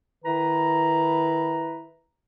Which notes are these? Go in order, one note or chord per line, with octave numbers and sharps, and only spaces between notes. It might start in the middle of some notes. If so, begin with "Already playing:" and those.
D#3 E4 B4 A#5